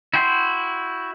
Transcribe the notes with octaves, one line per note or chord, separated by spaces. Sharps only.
E4 F#4 G5 C6